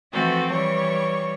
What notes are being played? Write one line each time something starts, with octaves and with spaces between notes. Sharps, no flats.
E3 F3 A3 C4 F#4 A4
E3 G3 C#5 C#6